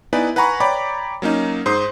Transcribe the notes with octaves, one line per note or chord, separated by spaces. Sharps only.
B3 D#4 E4 B4 D5 G#5
B4 F#5 G#5 A#5 B5 C#6
C#5 D5 G5 A#5 B5 D6
F#3 A#3 C#4 D#4
G#2 C5 C6 D#6